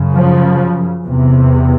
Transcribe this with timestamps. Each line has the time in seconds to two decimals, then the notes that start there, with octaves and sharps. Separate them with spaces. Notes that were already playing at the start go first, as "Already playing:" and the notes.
Already playing: F#2 C#3
0.14 F3
1.05 E2 C3